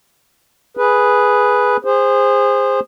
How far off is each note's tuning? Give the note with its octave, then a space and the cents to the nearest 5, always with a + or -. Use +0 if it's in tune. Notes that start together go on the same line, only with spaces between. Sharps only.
G#4 +0 B4 +0
G#4 -30 C5 +0